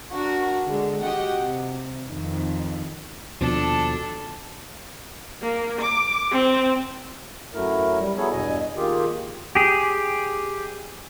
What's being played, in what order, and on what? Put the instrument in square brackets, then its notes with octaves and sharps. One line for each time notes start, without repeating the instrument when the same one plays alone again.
[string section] D4 F#4 A#4
D3 G#3
F#4 G4 D#5 F#5 G5
C3
F2 D#3
[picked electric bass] D#2 B2 F3 [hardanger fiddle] D4 A4
[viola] A#3
D6
C4
[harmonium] F#2 F#3 A3 E4 A#4
G3
F#3 B3 E4 G#4 A4 C#5
E2 G2 B2 D#5 G#5
D#3 A#3 F4 G4 G#4
[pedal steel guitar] G4 G#4